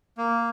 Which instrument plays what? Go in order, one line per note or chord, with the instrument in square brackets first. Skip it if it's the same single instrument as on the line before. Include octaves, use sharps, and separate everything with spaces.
[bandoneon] A#3